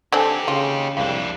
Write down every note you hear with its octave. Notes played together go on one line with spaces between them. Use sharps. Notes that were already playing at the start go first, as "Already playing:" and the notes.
D3 C4 D4 D#4 G4 A4 G#5
C#3 F4
C2 F2 D4 F5